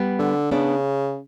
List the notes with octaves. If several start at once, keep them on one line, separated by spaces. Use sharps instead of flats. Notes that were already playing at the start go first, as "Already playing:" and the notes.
Already playing: G3 B3
D3
C#3 B3 D4